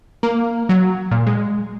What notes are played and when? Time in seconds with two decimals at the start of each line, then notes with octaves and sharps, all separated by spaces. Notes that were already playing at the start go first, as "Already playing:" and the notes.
0.23 A#3
0.69 F#3
1.11 A#2
1.27 G#3